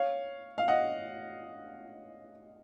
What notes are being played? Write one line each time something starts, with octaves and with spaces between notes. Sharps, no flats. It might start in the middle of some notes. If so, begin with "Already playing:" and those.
Already playing: C#5 F5
F5
D#5 F#5